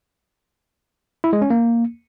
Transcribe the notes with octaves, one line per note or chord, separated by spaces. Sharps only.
E4
G#3
C#4
A#3